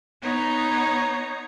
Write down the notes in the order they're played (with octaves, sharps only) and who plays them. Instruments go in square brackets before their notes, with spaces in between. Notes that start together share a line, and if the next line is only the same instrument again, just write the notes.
[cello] B3 D#4 [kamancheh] C#5 A#5